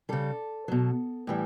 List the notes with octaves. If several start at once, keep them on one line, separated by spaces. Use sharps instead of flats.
C#3 G3 A4
B2 F#3
A2 E3 G3